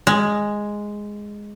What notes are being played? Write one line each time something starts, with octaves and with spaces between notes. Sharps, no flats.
G#3